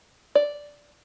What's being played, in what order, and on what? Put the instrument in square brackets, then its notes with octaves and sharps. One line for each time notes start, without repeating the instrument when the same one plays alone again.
[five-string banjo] D5